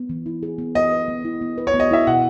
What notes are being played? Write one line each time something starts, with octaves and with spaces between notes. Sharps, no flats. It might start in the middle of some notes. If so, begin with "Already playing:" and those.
Already playing: B3
E3
E4
G#4
B3
B3 D#5
B4
B3
E4
B3
B4
C#5
B3
D#5
E4 E5
B2 F#5